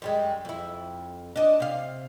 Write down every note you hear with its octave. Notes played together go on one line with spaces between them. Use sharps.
F#2 G3 G#3
F2 E4
D4 D#5
C3 F5